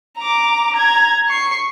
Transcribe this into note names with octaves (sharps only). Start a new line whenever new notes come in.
A#5 D6
A#5 G#6
C#6 C7